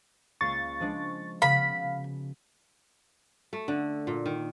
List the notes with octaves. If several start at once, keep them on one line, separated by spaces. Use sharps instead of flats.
C#2 A#3 C#6 A6 C7
F3 G#3 D4
C#3 B3 F#4 F5 B5
A3
D3
A#2
D#3